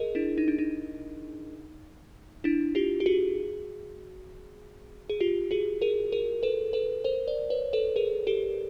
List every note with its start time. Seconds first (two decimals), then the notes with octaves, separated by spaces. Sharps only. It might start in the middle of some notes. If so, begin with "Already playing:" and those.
Already playing: G#4 A#4 D#5
0.15 D4 E4
0.38 D#4
0.48 D4
0.59 D#4
2.44 D4 E4
2.75 F4 G4
3.00 G4
3.06 F#4 G#4
5.10 G#4
5.20 F4 G4
5.51 F#4 G#4
5.82 G#4 A#4
6.12 G#4 A#4
6.43 A4 B4
6.73 A4 B4
7.04 A#4 C5
7.28 C5 D5
7.50 B4 C#5
7.73 A4 B4
7.96 G#4 A#4
8.27 G4 A4